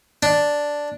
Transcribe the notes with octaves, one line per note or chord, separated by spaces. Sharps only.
D4